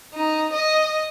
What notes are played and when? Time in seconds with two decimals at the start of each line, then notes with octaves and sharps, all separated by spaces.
0.12 D#4
0.52 D#5